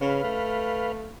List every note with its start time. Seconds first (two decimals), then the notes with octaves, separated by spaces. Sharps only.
0.01 C#3 B4 F5
0.24 A3